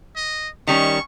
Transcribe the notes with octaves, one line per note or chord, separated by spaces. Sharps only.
D#5
D#3 G3 C#4 C#6